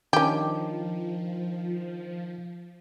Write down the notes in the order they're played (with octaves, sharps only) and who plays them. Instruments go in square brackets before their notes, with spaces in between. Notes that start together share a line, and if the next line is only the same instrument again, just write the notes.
[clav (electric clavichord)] D#3 D4 [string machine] F3 [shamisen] C#4 G4